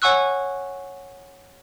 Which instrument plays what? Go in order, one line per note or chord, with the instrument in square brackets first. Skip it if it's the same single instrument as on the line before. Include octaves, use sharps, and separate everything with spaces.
[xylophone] C#5 F#5 G#5 C#6 E6 F#6